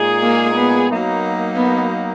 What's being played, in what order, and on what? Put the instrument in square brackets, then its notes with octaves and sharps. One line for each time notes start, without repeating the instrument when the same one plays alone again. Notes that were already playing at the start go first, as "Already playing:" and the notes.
Already playing: [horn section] A#2 G#3 D#4 G#4
[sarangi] A#3
B3
[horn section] F#3 A#3 D#4
[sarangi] B3